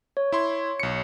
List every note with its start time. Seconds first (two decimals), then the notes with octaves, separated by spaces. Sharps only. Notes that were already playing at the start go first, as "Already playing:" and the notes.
0.17 C#5
0.32 E4 C6
0.80 B1 C#7